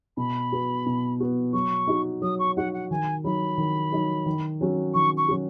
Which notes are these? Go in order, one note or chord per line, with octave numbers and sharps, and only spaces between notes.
B2 B5
B3 F#4
B2
B3 F#4
F#3 C#6
D#4 F#4
F#3 D#6
C#6
D#4 F#4 F#5
F#5
D#3 G#5
F#3 D#4 B5
D#3
F#3 D#4
D#3
F#3 C#4 F#4
D#3 C#6
C#6
F#3 C#4 F#4